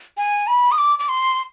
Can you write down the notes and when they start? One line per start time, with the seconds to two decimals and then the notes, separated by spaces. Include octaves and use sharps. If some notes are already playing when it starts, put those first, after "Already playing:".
0.17 G#5
0.47 B5
0.72 D#6
0.78 D6
0.99 D6
1.09 C6